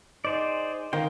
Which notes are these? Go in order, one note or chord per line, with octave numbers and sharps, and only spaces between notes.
D#4 G#4 C5 D5
D#3 F4 A#4 C5 G5